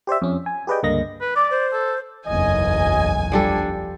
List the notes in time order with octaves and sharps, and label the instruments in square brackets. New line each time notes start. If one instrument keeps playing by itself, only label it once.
[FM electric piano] G4 C5 D5 E5
F2 C#4
G#5
G4 G#4 B4 D5 D#5 G5
C#2 G2 D3 A#3 D#5 A#6
[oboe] B4
[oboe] D5 [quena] D6
[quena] C5
[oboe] A4
[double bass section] F#1 B1 E2 [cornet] D#5 [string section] G#5
[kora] F3 G3 A4 [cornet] D4